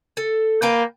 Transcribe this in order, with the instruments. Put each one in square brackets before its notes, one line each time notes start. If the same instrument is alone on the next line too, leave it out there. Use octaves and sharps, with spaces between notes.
[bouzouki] A4
[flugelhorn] A#3 [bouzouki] B4 G5 A5